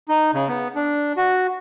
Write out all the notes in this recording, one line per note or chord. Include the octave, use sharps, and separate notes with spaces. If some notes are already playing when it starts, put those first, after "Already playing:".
D#4
C#3
B3
D4
F#4